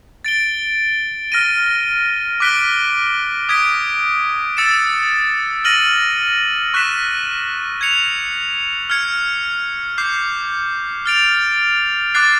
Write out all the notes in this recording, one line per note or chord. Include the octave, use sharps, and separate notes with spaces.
A6 D7 G7
F6 A#6 D#7
D6 F#6 B6 D7 G7
D#6 G#6 B6 D7
E6 A6 C#7 E7
F6 A#6 D#7 F#7
C#6 F#6 B6 E7
G#6 C#7 F7
F6 G#6 C#7
D6 G6 C7
F6 A6 D7 F7
D6 F#6 A6 C7